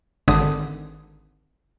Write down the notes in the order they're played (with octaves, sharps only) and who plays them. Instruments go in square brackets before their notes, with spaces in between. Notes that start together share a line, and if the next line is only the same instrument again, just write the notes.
[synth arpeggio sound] G#1 D3 D#6